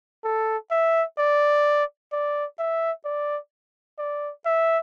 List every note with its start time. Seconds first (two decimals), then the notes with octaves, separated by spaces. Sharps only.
0.24 A4
0.71 E5
1.18 D5
2.13 D5
2.59 E5
3.05 D5
3.99 D5
4.46 E5